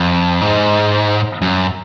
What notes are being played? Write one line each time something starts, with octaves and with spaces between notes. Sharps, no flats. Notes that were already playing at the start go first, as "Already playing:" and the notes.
Already playing: F2
G#2
F#2